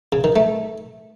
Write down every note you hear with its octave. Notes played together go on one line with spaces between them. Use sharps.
C#3
D#3
A3